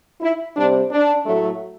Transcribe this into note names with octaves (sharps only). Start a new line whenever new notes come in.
E4
C3 G3 C4 D4
D4
A2 F#3 A3